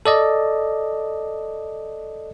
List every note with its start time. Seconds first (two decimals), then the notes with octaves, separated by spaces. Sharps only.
0.06 A4 D5 D#5